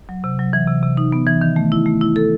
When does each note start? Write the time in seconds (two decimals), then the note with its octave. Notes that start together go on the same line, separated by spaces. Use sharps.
0.09 F#3
0.24 C3
0.39 F#3
0.53 E3
0.68 C3
0.83 C3
0.97 D#4
1.12 B3
1.26 E3
1.41 D#3
1.56 A3
1.72 E4
1.86 A3
2.01 E4
2.16 A4